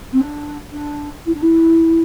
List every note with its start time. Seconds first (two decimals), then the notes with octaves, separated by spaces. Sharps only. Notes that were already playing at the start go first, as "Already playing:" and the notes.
0.13 C4
0.21 D4
0.73 D4
1.26 E4
1.34 D4
1.42 E4